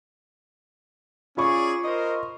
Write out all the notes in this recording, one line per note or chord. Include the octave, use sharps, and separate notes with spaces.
C#4 F4 G#4 D5 B5 C#6
A#4 C5 D#5